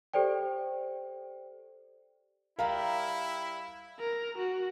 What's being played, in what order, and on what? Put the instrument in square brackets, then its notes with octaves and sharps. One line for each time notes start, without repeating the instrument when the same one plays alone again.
[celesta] G4 A4 C5 D5 G5
[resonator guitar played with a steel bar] G3 G4 A#4 [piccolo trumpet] E4 [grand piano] F5
[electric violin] A#4
F#4